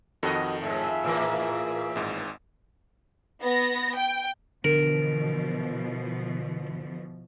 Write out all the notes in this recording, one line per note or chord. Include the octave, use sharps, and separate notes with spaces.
F2 D#3 F#4 A4 D#5
G#2 F4 G#4 E5
A2 E3 A#3
G#1 G#2
B3 A#6
G5
B2 D3 E3 F3 A#4